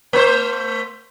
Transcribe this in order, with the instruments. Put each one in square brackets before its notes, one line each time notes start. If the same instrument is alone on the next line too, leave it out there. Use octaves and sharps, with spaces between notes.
[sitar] A3 C5